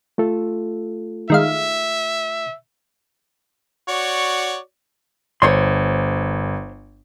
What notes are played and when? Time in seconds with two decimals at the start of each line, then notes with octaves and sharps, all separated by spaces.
0.18 A3 F4 A4
1.30 D#3 G#3 E5 F5
3.88 F#4 C#5 D5
5.42 G1 C5 C#5 C6